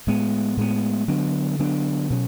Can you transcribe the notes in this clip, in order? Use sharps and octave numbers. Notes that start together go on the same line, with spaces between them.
A2 G#3 B3
A2 G#3 B3
D3 F#3 B3 D4
D3 F#3 B3 D4
B2 F#3 C#4